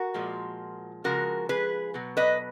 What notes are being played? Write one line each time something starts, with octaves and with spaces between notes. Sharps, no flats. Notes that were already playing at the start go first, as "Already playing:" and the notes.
Already playing: F#4 A#4
A#2 F3 G#3
C#3 F3 G#3 F#4 A#4
G#4 B4
B2 F#3
B4 D#5